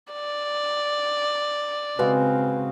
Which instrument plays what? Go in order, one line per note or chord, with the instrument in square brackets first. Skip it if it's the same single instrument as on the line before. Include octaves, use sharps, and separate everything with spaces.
[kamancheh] D5
[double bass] C#3 C4 [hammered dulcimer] G#3 F#4 F5 [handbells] B4